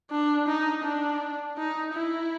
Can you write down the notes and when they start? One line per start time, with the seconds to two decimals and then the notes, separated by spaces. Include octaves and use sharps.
0.11 D4
0.48 D#4
0.84 D4
1.58 D#4
1.95 E4